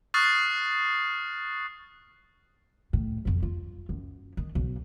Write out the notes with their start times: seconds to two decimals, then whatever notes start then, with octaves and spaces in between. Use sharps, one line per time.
0.14 C#6 D#6 F6 F#6 A6 C7
2.93 A2
3.25 B1 F2
3.43 F4
3.89 F#2
4.37 D#3
4.55 B1